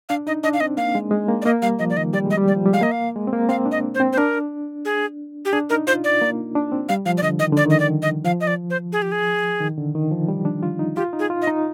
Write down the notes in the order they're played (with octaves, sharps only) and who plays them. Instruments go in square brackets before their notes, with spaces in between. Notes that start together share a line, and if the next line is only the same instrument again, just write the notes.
[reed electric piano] D4 [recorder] F5
[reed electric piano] D#4 [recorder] D#5
[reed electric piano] D4 [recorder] D#5
[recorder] F5
[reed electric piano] C4 [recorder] D#5
[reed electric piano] A#3 [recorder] F5
[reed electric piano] G#3
G#3
A#3
[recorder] D5
[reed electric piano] A#3 [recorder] D#5
[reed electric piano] G3 [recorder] F5
[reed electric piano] F3 [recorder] D#5
[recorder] D5
[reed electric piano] D#3 [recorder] D#5
[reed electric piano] G3 [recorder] D5
[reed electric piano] G#3 [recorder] D#5
[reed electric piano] G3
[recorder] D5
[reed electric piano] F3
G3
[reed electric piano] G#3 [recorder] F5
[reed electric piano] A#3 [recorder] D#5
[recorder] F5
[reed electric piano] G#3
C4
A#3
[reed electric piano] C4 [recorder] F5
[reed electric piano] D4
[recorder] D#5
C5
[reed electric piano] C4
[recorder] C5
[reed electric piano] D4 [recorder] A#4
[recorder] G#4
G4
[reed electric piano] D4 [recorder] G#4
[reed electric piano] D#4 [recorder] A#4
[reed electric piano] F4 [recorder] C5
[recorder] D5
[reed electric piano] A#3
D4
C4
[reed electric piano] G3 [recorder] F5
[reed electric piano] F3 [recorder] F5
[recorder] D5
[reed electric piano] D3 [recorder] D#5
[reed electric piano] D#3 [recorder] D#5
[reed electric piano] D3 [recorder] D5
[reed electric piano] D#3 [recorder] D#5
[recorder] D5
D#5
[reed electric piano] F3 [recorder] F5
[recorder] D#5
D5
C5
G#4
G4
G#4
[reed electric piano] D#3
D3
D#3
F3
G3
D4
F4
D#4
[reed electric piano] F4 [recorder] G4
[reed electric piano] D#4
[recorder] G#4
[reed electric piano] F4
[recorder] D#5
[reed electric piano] D#4